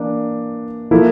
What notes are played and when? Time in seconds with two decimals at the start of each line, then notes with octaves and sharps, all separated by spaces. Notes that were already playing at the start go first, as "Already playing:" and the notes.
Already playing: E3 A#3 D4
0.91 F3 A#3 E4 A4